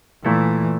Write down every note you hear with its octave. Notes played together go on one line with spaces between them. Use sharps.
A#2 E3 A3 E4 A4